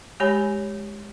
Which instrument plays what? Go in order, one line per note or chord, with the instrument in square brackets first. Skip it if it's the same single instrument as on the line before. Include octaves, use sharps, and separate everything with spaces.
[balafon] G#3 G4 C#5 G#5 B5